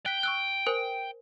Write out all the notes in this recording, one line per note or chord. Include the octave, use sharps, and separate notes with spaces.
G5 F#6 B6
C#6 E6 F#6
A#4 C5 G#5